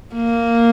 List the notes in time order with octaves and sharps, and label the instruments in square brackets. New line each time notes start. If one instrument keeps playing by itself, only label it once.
[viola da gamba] A#3